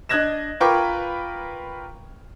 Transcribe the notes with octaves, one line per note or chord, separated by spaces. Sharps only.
D4 D#5 F#6 G#6 A#6 E7
F4 A#4 B4 G5 C#6 D6